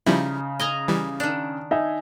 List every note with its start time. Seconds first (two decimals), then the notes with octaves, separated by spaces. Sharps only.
0.06 C#3 F3 G3 D#4 E4
0.59 D#5 G#5 A#5
0.88 E3 G3
1.20 D#3 D4
1.71 D#4 E5 G#5